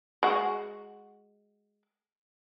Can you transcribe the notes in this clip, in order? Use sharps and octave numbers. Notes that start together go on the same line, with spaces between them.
G#3 F#4